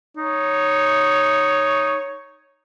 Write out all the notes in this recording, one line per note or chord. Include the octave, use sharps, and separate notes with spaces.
D#4 C#5